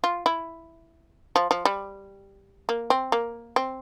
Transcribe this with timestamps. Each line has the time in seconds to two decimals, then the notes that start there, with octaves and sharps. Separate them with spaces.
0.04 F4
0.26 E4
1.36 F3
1.51 F3
1.65 G3
2.69 A#3
2.90 C4
3.12 A#3
3.56 C4